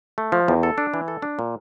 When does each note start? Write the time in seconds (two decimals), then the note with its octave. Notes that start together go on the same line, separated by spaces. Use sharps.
0.18 A3
0.32 F3
0.48 E2
0.63 A4
0.78 D4
0.94 E3
1.08 A4
1.22 D4
1.39 A#2